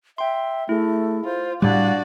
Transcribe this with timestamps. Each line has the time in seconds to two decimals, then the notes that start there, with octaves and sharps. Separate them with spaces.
0.18 E5 G5 C6
0.69 A3 E4 G#4
1.25 F4 C5
1.62 A2 G3 D4 F#4 D5 F5 F#6